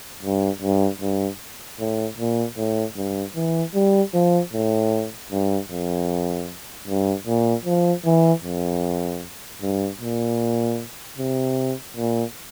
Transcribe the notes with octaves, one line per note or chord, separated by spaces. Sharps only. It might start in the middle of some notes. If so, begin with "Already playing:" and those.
G2
G2
G2
A2
A#2
A2
G2
E3
G3
F3
A2
G2
F2
G2
A#2
F3
E3
F2
G2
A#2
C3
A#2